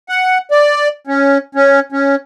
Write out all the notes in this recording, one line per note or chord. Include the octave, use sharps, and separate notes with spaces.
F#5
D5
C#4
C#4
C#4